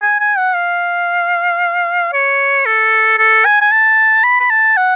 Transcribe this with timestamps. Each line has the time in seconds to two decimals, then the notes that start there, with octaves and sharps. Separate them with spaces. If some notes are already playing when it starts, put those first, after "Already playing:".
0.02 G#5
0.20 G#5
0.38 F#5
0.55 F5
2.13 C#5
2.66 A4
3.19 A4
3.45 G#5
3.61 G#5
3.72 A5
4.24 B5
4.40 B5
4.50 A5
4.77 F#5